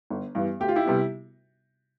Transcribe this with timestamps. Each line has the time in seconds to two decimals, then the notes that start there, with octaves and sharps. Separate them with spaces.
0.10 G1
0.35 G2 E3 B3
0.60 D2 G4
0.69 F4
0.76 E4 G4
0.85 C3 G3 B3